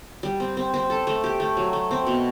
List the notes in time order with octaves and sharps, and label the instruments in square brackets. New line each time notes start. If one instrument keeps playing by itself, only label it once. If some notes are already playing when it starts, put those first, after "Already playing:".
[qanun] G3
C4
C4
C4
A4
A3
G4
A3
F#3
A3
C4
B2